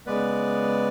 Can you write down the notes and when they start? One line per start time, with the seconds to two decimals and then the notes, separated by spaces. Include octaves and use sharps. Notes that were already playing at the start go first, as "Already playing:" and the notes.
0.06 C#3 G#3 B3 B4 D5